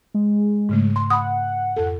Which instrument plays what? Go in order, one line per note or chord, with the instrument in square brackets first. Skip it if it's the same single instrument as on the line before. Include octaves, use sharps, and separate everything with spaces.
[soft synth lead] G#3
[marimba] G#2 C#3 A3
C6
[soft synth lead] F#5 [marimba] B5 D#6
[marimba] F2 A4